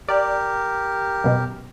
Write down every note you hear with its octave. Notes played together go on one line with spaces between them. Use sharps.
G4 A#4 D5
F#2 B2